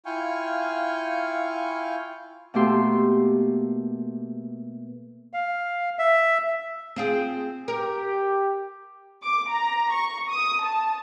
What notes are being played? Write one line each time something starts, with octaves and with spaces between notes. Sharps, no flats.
E4 F4 F5 G5 G#5 C#6
B2 A3 A#3 G4 C6 E6
F5
E5
C4 F4 G#4
G4 A#4
D6
A#5
C#6
D#6
A5